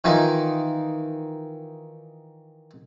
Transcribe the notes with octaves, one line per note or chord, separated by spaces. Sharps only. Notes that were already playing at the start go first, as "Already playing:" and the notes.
D#3 E3 D#4 F4 A#4